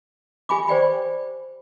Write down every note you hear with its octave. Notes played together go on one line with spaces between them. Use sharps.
G4 G#5 B5 D6
C5 D5 G5 B5